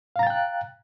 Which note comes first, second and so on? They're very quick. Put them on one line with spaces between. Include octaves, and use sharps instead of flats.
F5 A#5 A6 G5 F#6